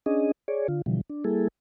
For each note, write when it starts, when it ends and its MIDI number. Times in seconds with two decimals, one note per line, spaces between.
0.06 0.31 61
0.06 0.31 62
0.06 0.31 68
0.06 0.31 75
0.48 0.67 68
0.48 0.67 73
0.48 0.67 74
0.68 0.82 50
0.68 0.82 65
0.86 1.01 47
0.86 1.01 50
0.86 1.01 52
0.86 1.01 53
0.86 1.01 55
1.10 1.24 62
1.25 1.48 55
1.25 1.48 58
1.25 1.48 64
1.25 1.48 68
1.25 1.48 69